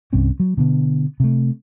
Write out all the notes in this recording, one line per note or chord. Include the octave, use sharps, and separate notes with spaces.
C2 G2 C4 C#4
F#3
B2 D3 B3
C3 A3